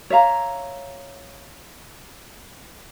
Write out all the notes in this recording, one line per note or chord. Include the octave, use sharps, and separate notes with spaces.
C#5 E5 F5 A#5